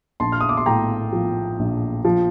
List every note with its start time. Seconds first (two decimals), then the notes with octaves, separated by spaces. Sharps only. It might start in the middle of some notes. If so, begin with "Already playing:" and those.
0.20 A#1 A5 C6
0.32 F6
0.41 D#6
0.49 D6
0.57 C6
0.66 A2 G5 A#5
1.12 F3
1.59 A#1
2.05 F3